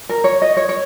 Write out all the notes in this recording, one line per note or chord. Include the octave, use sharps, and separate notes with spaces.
A#4
C#5
D#5
C#5
C#5